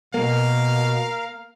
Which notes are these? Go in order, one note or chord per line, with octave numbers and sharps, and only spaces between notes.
B2 A#3 A#4 F5